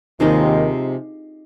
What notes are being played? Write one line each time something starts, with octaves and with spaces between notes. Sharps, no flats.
D#2 C3 D#3 F3 G#3 D#4